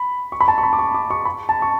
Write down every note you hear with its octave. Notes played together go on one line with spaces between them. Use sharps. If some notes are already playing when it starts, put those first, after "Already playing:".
Already playing: B5
C#6
B5
A5
C#6
B5
D6
C#6
D6
C#6
B5
A5
C#6